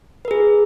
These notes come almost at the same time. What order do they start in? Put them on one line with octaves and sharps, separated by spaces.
B4 A#4 G#4